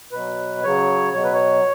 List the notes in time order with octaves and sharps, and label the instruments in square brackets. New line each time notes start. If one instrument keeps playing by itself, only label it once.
[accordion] B2 F#3 B4
C#3 F#3 C#5
B2 F#3 C#5
B4
C#5